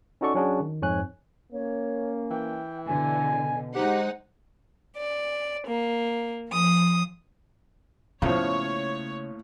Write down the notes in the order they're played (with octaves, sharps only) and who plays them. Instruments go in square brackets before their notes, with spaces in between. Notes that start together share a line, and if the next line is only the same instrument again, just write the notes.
[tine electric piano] C#4 D#4 F#4 A4 D5 C#6
F#3 C#4 D4 F#4 G#4
D#3
F2 G#2 C#5 G#5 F#6
[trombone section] A#3 C#4 [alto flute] C#5
[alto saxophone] E3 [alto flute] G5
[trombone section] B2 [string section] D3 [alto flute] G#5
[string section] G#3 D#4 F#5 [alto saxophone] G4 [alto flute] C5
[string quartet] D5
A#3
F3 D#6
[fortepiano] B1 F3 [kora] A2 A#3 [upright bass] C#3 [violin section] C#5